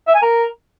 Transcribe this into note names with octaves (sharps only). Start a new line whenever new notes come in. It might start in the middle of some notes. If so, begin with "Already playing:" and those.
E5
G#5
A#4